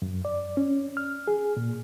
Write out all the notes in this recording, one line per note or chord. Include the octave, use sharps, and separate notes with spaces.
F#2
D5
C#4
F6
G#4
A#2